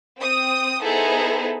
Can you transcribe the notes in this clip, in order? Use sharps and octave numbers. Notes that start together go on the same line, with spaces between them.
C4 G5 D#6
B3 D#4 E4 G#4 A4 C5